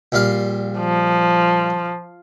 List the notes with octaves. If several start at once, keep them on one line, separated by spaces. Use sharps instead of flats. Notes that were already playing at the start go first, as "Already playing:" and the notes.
A#1 G3 F5
F3